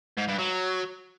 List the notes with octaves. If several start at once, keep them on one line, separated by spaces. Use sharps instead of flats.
G#2
G2
F#3